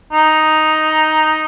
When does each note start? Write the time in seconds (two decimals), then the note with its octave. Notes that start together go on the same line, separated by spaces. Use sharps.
0.12 D#4